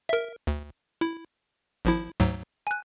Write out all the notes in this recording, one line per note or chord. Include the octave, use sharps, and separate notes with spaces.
A#4 E5
D2
E4
G#1 F3 E4
D2 G#2 F#3
G#5 F#6